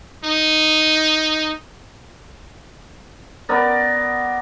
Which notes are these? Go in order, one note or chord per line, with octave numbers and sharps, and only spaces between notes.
D#4
B3 A#4 D5